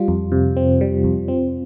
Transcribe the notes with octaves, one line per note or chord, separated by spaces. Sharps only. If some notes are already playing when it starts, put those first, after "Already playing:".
Already playing: G3 F4
F2
C3
C4
G3
F2
C4